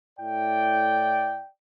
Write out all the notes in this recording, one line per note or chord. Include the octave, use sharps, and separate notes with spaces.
A2 A3 E4 D5 G5